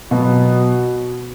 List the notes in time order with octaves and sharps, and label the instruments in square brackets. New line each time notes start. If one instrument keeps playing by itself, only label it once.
[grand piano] B2 F#3 B3 [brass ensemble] F#4